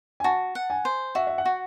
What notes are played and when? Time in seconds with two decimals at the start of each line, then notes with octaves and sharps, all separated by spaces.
0.20 G#5
0.24 F#4 A5
0.55 F#5
0.70 G#5
0.85 C5
1.15 F#4 E5
1.27 E5
1.38 F#5
1.45 F#4